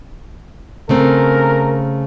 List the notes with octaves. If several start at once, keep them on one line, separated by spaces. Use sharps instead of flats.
C#3 A3 C4 A#4